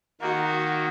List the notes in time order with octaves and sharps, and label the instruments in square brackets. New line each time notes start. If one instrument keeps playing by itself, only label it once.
[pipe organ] D#3 A#3 [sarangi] F#4